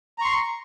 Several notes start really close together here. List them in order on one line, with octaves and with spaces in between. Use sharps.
A#5 C#6 C6